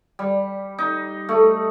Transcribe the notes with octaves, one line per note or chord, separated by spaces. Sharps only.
G3
D#4
A3